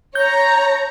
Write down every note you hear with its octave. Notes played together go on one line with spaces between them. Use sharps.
C#5 A#5 G6